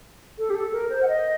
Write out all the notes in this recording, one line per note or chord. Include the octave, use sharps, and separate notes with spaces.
A4
G4
A4
A#4
C5
F#5
D#5